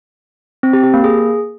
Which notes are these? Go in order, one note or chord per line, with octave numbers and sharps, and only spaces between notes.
C4
G4
G4
A#3
G#4